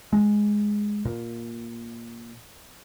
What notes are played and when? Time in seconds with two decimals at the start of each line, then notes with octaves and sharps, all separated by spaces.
0.13 G#3
1.05 A#2